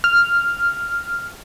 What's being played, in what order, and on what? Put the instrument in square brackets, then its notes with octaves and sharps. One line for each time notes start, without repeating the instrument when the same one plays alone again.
[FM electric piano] F6